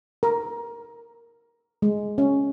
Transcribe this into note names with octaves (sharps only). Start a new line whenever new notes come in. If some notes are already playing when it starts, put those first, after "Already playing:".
A#4
G#3
C#4